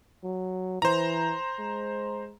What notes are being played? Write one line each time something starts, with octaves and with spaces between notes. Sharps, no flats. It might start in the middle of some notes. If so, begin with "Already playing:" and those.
F#3
E3 C5 A#5
G#3